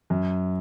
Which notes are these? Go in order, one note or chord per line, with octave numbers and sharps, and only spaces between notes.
F#2